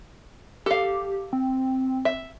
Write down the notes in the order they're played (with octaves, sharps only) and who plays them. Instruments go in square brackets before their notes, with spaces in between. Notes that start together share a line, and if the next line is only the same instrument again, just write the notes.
[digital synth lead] G4 [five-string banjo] A4 F5
[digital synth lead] C4
[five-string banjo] E5